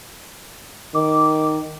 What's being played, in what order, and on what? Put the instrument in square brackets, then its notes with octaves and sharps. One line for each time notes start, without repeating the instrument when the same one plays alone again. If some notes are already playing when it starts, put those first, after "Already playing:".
[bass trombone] D#3 [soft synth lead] D6